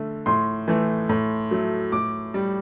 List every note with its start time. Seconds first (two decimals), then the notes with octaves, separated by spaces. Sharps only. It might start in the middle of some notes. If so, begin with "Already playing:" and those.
Already playing: D3 A3
0.26 A2 C6
0.68 E3 A3
1.09 A2
1.51 F#3 A3
1.92 A2 D6
2.34 G3